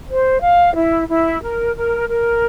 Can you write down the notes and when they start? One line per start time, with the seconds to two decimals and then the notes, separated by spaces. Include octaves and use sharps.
0.07 C5
0.40 F5
0.74 E4
1.07 E4
1.41 A#4
1.75 A#4
2.08 A#4